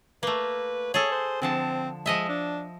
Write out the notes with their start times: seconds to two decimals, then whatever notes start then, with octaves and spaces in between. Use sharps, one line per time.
0.23 A3 A#3 B4
0.94 G#4 A4 C#5
1.11 C5
1.42 D3 F3 C4 A5
2.06 F3 G#3 D#5 E5
2.28 D4